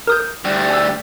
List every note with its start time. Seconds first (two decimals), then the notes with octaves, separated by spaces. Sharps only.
0.07 A#4 D#6 G6
0.45 D2 G3
0.70 G#5 E6